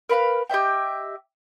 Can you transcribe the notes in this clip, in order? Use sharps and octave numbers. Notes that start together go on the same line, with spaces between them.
A#4 B4 F5 B5
G4 D#5 E5 G5